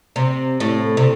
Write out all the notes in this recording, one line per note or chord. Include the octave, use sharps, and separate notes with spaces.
C3
A2
C3